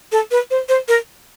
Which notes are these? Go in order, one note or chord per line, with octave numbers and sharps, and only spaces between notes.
A4
B4
C5
C5
A#4